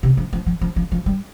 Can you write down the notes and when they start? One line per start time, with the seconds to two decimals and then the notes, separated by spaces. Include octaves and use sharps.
0.03 C3
0.17 F3
0.33 F3
0.47 F3
0.61 F3
0.76 F3
0.92 F3
1.06 G3